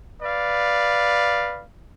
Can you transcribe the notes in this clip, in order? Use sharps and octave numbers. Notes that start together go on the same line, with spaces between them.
B4 D5 F5